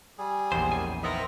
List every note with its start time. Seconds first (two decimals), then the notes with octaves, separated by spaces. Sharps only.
0.18 G3 G#4
0.52 A#1 E2 C5
0.72 F#2 G#5
1.03 D#3 B3 C4 A#4 D#5 E5